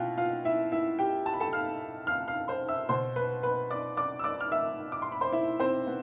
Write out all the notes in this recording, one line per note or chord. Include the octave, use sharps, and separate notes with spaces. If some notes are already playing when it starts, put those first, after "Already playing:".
Already playing: B2 E4 F4 F5 G5
F4 F5
E4 E5
E4 E5
G4 G5
A5
B5
A4 A5
F5 F6
F5 F6
F5 F6
C5 C6
E5 E6
B2 C5 C6
B4 B5
B4 B5
D5 D6
D5 D6
E6
D5 D6
F6
E5 E6
D6
C6
B5
C5 C6
E4 E5
C4 C5
B3